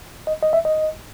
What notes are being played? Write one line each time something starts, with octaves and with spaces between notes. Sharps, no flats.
D#5
D#5
E5
D#5